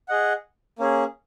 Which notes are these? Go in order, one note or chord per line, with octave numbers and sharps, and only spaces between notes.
G#4 D#5 F#5
A#3 C#4 G#4